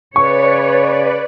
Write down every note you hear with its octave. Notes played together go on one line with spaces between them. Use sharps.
C#3 B4 C#5 D5 C#6